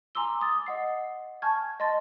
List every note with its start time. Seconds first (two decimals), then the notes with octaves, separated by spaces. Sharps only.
0.15 G#5 A#5 C6 D6 E6 G7
0.40 D6 D#6 A6
0.66 D#5 F#5 C7
1.42 G#5 A5 C#6 F6 G6 G#6
1.80 D#5 A5 C6 A6